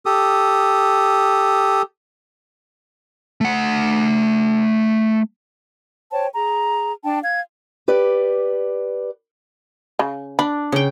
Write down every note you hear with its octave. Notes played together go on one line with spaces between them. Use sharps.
G4 A4 D#6
A3 F#5
C5 C#5 G5 A5
G#4 A#5
D4 G5 A5
F5 G#6
G4 B4 D5
C#3
D4 B5
C#3 G5